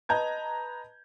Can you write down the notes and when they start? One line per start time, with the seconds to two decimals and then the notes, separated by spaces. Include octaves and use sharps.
0.09 B4 D#5 A5 A#5 G6 G#6